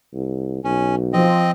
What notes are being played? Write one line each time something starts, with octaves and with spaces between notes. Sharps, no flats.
C2
B1 C#4
F3 C4 D#5